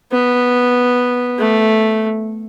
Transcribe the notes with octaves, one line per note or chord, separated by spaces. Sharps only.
B3
A3